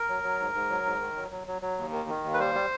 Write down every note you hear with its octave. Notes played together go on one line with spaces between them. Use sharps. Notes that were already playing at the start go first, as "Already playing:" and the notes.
Already playing: A#4
F#3
F#3
G#2
G#2
F#3
G#2
D#3
F#3
F#3
F#3
F#3
D#2
D#3
D#3
D#2
B4
G3 C5
G3